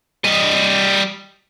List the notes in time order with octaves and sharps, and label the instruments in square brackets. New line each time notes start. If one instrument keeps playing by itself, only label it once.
[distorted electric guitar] G3 D#5